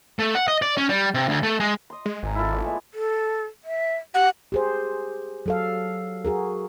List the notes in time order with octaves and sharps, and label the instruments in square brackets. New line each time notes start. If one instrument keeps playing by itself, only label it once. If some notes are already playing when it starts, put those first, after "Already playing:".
[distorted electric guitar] A3
F#5
D#5
D5
C#4
G3
C3
D2
A3
G#3
[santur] D#5 C6
[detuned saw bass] G#3
[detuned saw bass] G#1 [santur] G#5 A#5
[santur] E4 F4 A4
A3 D5
G#3 B3 G#5
[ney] A4
E5
[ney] G4 [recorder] F#5
[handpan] G4 G#4 C5
F#3 A4 F5
F#4 G#4 A#4